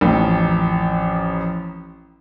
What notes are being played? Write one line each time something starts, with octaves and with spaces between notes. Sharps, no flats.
A1 F2